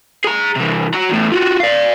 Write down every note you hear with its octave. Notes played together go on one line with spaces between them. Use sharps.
G#4 A#5
C3 E3
F#4 A#5
E2 A2
F4 F#4
D5 F5